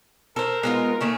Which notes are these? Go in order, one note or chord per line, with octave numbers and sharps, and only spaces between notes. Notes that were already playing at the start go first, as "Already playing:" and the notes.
A4 A#4 C5
G#3 B3 D#4 F4
D#3 A3 A#3 C#4